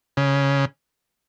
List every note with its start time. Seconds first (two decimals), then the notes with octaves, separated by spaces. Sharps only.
0.17 C#3